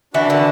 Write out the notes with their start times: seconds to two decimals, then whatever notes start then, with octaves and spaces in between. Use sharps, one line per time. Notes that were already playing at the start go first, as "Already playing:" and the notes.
0.14 E3 D4 F#4 B4 F#5 A5
0.30 D3